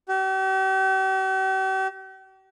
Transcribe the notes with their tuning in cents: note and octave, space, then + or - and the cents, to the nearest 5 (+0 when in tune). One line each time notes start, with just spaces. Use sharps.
G4 -45